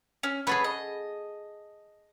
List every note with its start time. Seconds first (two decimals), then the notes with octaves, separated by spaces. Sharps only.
0.23 C#4
0.47 G#4 A4 B4 C#5 F#5
0.64 D#5